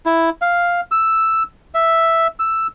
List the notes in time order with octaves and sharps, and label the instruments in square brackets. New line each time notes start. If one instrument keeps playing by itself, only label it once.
[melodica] E4
F5
E6
E5
E6